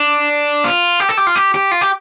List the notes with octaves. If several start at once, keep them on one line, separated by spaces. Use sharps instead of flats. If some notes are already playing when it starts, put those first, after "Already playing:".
Already playing: D4
F4
G4
A4
G4
F4
G4
G4
F4
G4